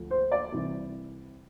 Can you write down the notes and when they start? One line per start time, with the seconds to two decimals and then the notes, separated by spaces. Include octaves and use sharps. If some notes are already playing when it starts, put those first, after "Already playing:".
Already playing: D2 D3 F3
0.11 C5
0.32 D5
0.52 C2 C3 E3